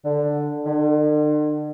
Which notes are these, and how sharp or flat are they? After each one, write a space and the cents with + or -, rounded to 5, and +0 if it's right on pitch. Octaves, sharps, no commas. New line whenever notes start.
D3 +5
D3 +45